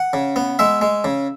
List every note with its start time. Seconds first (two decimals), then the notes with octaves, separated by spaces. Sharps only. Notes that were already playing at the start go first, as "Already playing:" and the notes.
Already playing: F#5
0.13 C#3
0.36 B3
0.59 G#3 E5
0.81 G#3
1.04 C#3